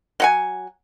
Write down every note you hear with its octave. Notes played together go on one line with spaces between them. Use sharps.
F#3 F#5 G#5